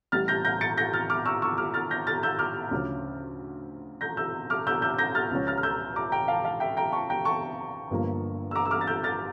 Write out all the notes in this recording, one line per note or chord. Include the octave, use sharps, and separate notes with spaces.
A1 A2 G3 F6 A6
G6 A#6
G6 A#6
A6 C#7
G6 A#6
F6 A6
D6 F6
C#6 E6
C#6 E6
D6 F6
F6 A6
G6 A#6
F6 A6
E6 G6
D6 F6
D2 C#3 F3 C#4
G6 A#6
E6 G6
D6 F6
E6 G6
E6 G6
G6 A#6
F6 A6
C#2 C#3 F3 C#4
F6 A6
F6
E6 G6
A#5 D6
G5 A#5
F5 A5
F5 A5
E5 G5
G5 A#5
A5 C#6
G5 A#5
A5 C#6
G1 G2 D3 F3 A#3
E6
A#5 D6
E6
D6 F6
A6
E6 G6
F6 A6